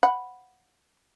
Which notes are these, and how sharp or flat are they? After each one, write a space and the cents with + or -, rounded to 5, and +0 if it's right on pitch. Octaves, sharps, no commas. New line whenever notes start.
F#5 +0 B5 +0